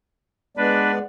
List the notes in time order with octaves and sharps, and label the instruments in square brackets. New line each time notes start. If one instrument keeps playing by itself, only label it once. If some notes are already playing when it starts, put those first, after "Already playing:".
[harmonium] G#3 B3 D5 [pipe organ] D4 B4